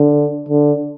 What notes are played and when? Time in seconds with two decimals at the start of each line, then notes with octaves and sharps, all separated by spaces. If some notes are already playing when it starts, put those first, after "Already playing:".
Already playing: D3
0.49 D3